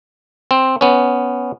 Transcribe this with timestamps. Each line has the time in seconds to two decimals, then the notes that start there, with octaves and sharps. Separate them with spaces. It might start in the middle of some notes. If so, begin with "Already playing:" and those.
0.51 C4
0.81 B3 C#4